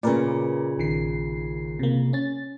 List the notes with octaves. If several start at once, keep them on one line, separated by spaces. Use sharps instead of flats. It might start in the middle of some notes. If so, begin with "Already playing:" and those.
A#2 C#3 A#4 B4 D5
A#1 D#3 C7
C3 A#3
C#4 A6